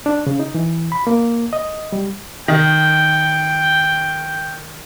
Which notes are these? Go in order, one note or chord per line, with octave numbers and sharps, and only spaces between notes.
D4
C#3
D#4
E3
B5
A#3
D#5
G3
D#3 G5